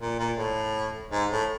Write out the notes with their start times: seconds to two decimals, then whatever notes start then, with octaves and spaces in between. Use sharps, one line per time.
0.01 A#2
0.19 A#2
0.37 A2
1.12 G#2
1.31 A2